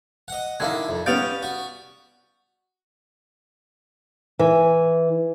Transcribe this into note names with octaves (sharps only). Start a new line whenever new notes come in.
D#5 F#5
D3 D#3 D4 E4 F5 E6 G#6
F2 E5
G3 B3 C#4 F5 G6 A6 D7
F#4
E3